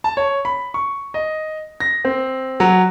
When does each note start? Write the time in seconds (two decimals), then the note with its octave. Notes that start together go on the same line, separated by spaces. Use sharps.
0.04 A5
0.17 C#5
0.45 B5
0.74 C#6
1.14 D#5
1.80 A#6
2.05 C4
2.60 F#3